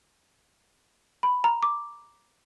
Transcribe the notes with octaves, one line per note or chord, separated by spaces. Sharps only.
B5
A#5
D6